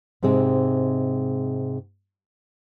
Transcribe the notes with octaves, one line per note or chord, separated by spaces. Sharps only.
G#2 C3 G#3 C4